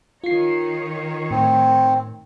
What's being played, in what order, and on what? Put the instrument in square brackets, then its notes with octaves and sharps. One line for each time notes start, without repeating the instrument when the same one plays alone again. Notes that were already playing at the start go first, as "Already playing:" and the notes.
[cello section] D#3 D#4 C#5 [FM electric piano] F4 C7
[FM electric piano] A2 [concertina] C4